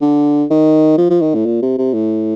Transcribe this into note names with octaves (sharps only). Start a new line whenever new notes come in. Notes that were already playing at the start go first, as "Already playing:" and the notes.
D3
D#3
F3
F3
D#3
A2
A#2
C3
C3
A2